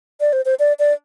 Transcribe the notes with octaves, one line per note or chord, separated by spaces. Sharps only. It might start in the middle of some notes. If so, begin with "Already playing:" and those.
D5
C5
C5
D5
D5